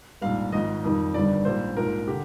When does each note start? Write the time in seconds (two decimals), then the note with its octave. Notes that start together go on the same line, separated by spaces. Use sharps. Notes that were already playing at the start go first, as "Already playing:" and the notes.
0.21 A#1 G#2 G3 F5
0.52 G#1 G#2 F3 D#5
0.84 F2 D#3 G3
1.14 G1 G2 D#3 G3 D5
1.45 A#1 G#2 G3 C5
1.76 A#1 G#2 F3 A#4
2.08 D3 G4